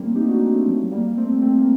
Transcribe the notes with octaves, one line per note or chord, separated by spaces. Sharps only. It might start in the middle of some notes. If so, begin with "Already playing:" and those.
Already playing: G3 A3 A#3 C4
D#4 G4
D4 F#4
C4 D#4
A3 C4
F#3 A3
G3 A#3
A3 C4
A3 C4
A#3